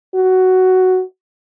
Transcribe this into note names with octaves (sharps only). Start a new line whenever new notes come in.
F#4